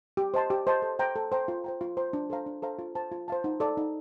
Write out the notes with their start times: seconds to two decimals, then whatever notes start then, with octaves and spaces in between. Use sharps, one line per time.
0.17 G4
0.34 C5 D#5 A5 C6
0.50 G4
0.67 C5 D#5 A5 C6
0.82 A4
0.99 C5 G5 A#5
1.16 A4
1.32 C5 G5 A#5
1.48 F4
1.64 C5 G5 A#5
1.81 F4
1.97 C5 G5 A#5
2.13 D4
2.30 A4 C5 F5 A#5
2.46 D4
2.62 A4 C5 F5 A#5
2.79 F4
2.95 C5 F5 A5
3.12 F4
3.28 C5 F5 A5
3.44 D#4
3.60 A4 D5 F5
3.77 D#4